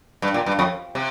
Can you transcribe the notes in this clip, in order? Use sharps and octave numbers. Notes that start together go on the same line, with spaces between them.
G2
A#2
G2
F2
C3